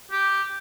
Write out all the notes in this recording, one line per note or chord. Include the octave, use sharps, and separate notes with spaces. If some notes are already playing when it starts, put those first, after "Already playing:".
G4